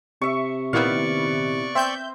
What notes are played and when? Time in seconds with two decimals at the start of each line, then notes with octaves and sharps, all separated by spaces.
0.22 C3 E5 C#6
0.73 A#2 D#3 B3 E4 D5 F5 C#6
1.75 C4 E5 G6